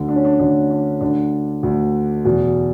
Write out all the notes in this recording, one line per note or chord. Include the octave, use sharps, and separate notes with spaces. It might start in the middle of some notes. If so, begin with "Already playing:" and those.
Already playing: D2 D3
D4
C#4
D4
D2 D3 D4
D4
D2 D3 D4
D2 D3
E2 B2